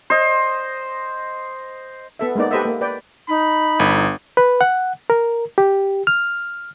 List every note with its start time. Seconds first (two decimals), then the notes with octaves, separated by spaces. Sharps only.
0.10 C5 D#5
2.19 B3 A4 E5
2.35 G#3 A#3 B3 D#4 D5
2.51 G4 A4 B4 C5 D#5 E5
2.65 A#3
2.81 B4 D5 G5
3.29 D#4 B5
3.79 G1
4.37 B4
4.61 F#5
5.10 A#4
5.58 G4
6.07 F6